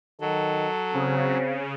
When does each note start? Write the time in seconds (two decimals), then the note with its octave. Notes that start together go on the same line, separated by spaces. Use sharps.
0.21 D#3 F#3 A4
0.94 C#3 C4